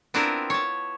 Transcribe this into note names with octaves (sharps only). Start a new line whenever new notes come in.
B3 C4 D4 E4 F4 A#4
C#5 A5